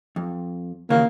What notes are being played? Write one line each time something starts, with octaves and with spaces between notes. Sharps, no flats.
F2
D#2 C#3 E3 A#3